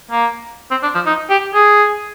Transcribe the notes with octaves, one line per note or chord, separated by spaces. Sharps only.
A#3
C4
D4
F3
D#4
G4
G#4